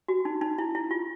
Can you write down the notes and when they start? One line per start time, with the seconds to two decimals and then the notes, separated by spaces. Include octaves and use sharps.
0.08 F#4
0.25 D#4
0.41 D#4
0.58 E4
0.75 E4
0.91 F4